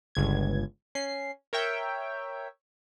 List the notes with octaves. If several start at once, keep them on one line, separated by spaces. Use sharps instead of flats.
G1 C#2 G#6
C#4 C7
A#4 C#5 E5 G5